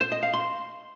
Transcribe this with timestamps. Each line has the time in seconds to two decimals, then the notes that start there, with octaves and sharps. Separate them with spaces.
0.01 C5
0.12 D#5
0.23 F5
0.34 C6